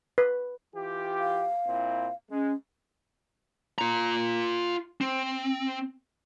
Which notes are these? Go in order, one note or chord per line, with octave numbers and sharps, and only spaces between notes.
B4
E3 F4 G4
F5
A#2 C4 E4
G#3 C#4
F4 A#5
C4